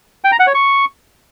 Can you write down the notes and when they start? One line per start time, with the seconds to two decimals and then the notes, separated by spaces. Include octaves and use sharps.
0.24 G5
0.32 A#5
0.39 F#5
0.47 C#5
0.54 C#6